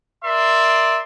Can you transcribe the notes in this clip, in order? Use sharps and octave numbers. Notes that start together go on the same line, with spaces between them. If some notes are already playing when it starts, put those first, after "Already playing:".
A#4 D5 E5 C6